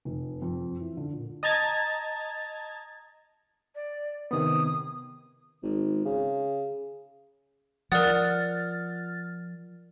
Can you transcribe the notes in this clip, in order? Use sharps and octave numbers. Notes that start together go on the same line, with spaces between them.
F1
F2
E3
D3
A#2
D#5 A5 A#5 G#6 A6
D5
C3 D#3 B3 D#6
G#1
C#3
F3 A#4 D5 F#5 D#6 F6 A6